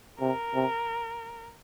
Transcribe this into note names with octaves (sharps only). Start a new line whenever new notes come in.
C3 A#4
C3